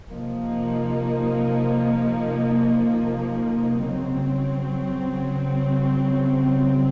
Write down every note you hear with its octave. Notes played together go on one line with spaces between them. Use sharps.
C3 F3 A#3 D#4
C#3 F#3 C4